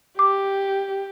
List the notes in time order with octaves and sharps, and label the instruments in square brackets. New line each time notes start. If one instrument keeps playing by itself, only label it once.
[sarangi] G4 [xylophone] D6